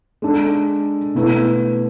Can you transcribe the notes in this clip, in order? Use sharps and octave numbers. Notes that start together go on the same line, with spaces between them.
G#3 D4 A4
B2 A3 E4 B4